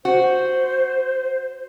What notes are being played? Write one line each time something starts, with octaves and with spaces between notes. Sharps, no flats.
F#4 C5